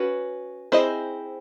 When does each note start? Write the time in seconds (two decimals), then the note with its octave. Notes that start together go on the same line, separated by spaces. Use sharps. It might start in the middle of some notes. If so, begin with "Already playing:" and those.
Already playing: C#4 F#4 B4
0.72 C4 E4 G#4 C5 D#5